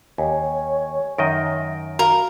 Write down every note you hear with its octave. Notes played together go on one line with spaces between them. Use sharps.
D#2 C#5 G#5
F#2 D#3 D#5 E5 A#6 D7
F#4 A#4 F5 B5